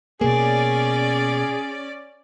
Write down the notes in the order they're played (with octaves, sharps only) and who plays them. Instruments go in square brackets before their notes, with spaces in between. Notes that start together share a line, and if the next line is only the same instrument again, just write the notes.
[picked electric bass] B2 A#3 [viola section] C#4 D5 [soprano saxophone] G#4